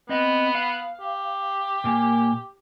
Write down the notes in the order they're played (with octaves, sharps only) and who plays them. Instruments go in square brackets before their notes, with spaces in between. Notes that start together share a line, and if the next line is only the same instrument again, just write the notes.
[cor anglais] B3 [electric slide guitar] C4 D#5
[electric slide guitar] F5
[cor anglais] G4
[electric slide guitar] A#2 A#3 G#5